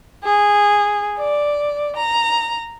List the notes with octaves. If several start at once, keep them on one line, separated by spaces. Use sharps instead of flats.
G#4
D5
A#5